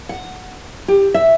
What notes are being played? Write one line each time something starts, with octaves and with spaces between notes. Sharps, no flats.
F#5
G4
E5